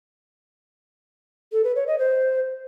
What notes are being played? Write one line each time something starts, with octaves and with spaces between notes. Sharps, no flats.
A4
B4
C#5
D#5
C5